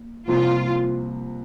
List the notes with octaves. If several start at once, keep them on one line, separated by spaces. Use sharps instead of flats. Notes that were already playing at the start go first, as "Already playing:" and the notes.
Already playing: A#3
C2 C3 F3 A#3 F4